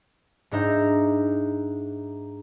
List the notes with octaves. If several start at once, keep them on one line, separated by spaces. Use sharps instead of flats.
G#2 D4 D#4 E5 A#5 G6